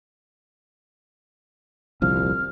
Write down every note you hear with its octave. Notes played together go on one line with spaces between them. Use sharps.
D#1 C2 F3 F6